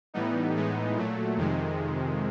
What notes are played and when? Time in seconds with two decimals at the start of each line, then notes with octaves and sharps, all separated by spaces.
0.14 A2 E3 G3 B3 D#4
0.54 A2 E3 G#3 B3 D#4
0.96 A#2 F#3 A3
1.37 F2 C3 D#3 G#3